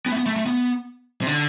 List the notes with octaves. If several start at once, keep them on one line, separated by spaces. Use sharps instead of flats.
B3
A3
B3
A3
A3
B3
C3
D3